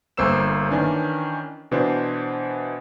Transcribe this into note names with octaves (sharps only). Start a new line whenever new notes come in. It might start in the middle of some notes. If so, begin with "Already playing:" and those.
G1 A#3 C5 E6 E7
D#3 E3 C#4 D4
B2 E3 D4 C5